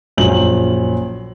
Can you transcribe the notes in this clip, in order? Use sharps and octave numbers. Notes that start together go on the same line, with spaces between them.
A#1 F#2 C#4 F#7